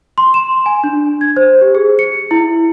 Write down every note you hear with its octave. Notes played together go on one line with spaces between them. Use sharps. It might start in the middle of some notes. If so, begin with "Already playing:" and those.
C6
E7
G#5
D4
G#6
C5
G4
G#4
C#7
E4